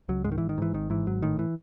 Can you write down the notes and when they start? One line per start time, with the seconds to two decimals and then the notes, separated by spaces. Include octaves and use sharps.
0.09 C#2 F#3
0.25 G#2 G#3
0.32 D#3
0.38 G#1 E3
0.49 D#3
0.58 G#2 E3
0.74 G#1 D#3
0.90 G#2 E3
1.06 G#1 F#3
1.22 A2 D#3
1.39 E3